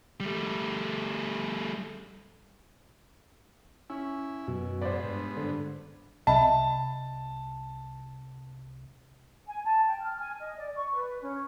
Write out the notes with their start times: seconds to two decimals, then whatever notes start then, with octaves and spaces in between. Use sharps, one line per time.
0.20 G3 A3
3.90 C#4 E4
4.48 F#2 B2
4.81 G#2 B3 C5 D5
5.04 G2
5.37 D3
6.27 C2 D#5 E5 A5 B5
9.47 G#5
9.63 A5
9.87 G5
10.00 F6
10.19 G#5
10.40 D#5
10.56 D5
10.75 C#6
10.93 B4
11.22 C#4